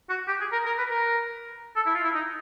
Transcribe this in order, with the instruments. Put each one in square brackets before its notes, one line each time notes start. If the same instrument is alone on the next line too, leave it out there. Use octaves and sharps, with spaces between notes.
[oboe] F#4
G4
G#4
A#4
A#4
B4
A#4
A4
E4
F4
E4
D#4